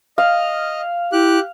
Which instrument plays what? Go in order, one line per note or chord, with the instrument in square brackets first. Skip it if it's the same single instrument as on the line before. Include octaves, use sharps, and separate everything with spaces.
[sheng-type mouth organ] D#5 [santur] F5
[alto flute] E4 [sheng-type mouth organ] G4 F#6